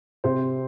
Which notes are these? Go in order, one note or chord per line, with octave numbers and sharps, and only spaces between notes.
C3 C5